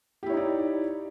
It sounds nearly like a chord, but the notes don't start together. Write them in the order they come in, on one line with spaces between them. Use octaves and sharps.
G4 E4 C#5 D#4 D5